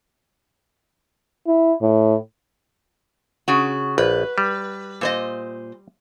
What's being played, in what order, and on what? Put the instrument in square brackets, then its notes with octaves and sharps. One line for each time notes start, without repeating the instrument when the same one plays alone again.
[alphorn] E4
A2
[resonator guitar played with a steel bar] C#3 F#4
[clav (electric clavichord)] A#1 [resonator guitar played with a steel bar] B4
[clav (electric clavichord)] G3
[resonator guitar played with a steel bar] A#2 C5 D#5